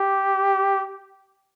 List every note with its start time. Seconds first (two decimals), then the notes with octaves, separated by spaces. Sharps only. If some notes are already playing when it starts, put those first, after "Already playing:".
Already playing: G4